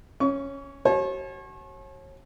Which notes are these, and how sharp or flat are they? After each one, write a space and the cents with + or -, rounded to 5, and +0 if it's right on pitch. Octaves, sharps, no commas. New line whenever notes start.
C#4 -5 C#6 +35
F#4 +45 C#5 -35 A5 -40